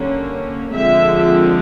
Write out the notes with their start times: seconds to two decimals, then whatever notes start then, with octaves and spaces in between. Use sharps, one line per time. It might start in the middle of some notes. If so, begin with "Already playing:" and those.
Already playing: D3 G3 A#3 C#4
0.74 D3 F3 G#3 C4 E5